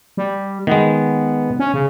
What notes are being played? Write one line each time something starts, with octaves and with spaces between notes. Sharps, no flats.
G3
D#3 G#3 B3
C#4
C#3